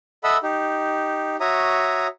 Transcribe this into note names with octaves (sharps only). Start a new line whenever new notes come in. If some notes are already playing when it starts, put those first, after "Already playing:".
A4 D#5 E5 F#5 B5 E6
D#4 G4
F#4 C#5 E5 A#5 D#6